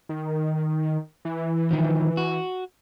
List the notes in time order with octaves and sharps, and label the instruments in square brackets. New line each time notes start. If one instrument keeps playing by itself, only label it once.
[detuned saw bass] D#3
E3
[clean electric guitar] D#3 F3
F#4